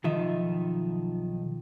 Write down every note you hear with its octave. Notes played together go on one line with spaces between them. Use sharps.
B1 D#3 F3 D#4 E5